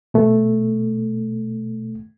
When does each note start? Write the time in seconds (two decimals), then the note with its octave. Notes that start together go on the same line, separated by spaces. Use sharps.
0.14 B2 A3